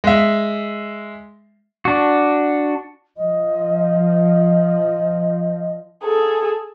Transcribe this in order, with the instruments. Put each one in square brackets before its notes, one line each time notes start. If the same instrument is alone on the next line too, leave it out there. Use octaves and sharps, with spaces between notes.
[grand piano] G#3 E5
[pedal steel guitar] D4 F#4
[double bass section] F3 [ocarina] D#5
[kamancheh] G#4 A4